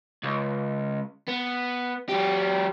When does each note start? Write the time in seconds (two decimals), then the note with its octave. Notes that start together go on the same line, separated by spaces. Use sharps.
0.23 C#2
1.28 B3
2.10 F#3 G4